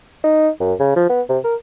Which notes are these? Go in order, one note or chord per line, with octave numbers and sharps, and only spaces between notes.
D#4
F#2
C#3
F3
B3
C3
A#4